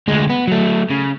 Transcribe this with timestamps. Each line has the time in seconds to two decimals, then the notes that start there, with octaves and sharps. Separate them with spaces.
0.08 D2 G#3
0.30 B3
0.47 F#3 A3
0.91 C#3